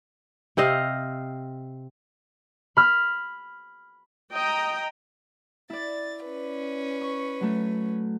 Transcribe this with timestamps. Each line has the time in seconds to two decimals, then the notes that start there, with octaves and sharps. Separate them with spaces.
0.57 C3 C4 D#5 F5
2.77 B5 F6
4.32 D#5 G5 A#5
5.70 E4 D5 A6
6.24 C#4 B4
7.01 C#6
7.40 F#3 A3